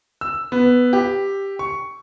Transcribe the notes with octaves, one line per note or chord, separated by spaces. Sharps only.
E6
B3
G4
C#6